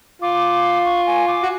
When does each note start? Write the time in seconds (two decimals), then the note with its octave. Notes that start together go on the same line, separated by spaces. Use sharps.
0.22 F4 D6
0.85 C#6
1.06 G#5
1.28 D6
1.42 F#4